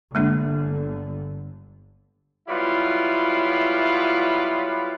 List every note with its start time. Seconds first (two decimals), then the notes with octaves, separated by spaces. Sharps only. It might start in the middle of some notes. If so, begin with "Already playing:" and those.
0.15 G1 D3 G#3 A#3 D4
2.49 F#3 G3 B3 E4 F4